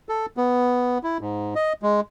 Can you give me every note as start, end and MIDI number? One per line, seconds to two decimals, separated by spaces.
0.09 0.26 69
0.37 0.98 59
1.03 1.18 64
1.21 1.54 44
1.55 1.73 75
1.83 2.00 56